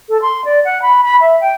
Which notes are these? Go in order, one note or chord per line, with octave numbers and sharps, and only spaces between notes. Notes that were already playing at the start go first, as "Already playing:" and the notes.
A4
C6
D5
F#5
B5
B5
E5
G5